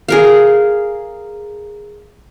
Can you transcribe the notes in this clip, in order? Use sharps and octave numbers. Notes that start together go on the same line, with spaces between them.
G#4 A#4 F5